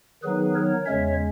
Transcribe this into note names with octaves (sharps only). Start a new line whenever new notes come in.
D#3 F#3 B3 D#4 G#4 B4
A#4 C#5
E2 C#3 G#3 C#4 C#5 E5